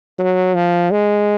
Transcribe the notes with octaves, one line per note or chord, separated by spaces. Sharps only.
F#3
F3
G#3